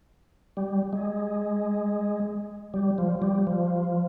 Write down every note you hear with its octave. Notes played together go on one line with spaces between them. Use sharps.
G3
G#3
G3
F3
G3
F3